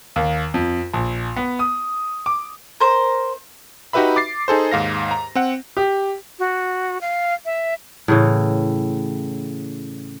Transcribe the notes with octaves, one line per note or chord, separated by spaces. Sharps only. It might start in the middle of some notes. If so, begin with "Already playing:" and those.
D#2
F2
A#1
B3
D#6
D6
A#4 C5
D#4 F#4 G4 B4 E5 B5
D6 A6 C7
D#4 G#4 A4 C5
D#2 G#2 F5 A#6
A#5
C4 F#5
G4
F#4
F5
E5
A2 C#3 E3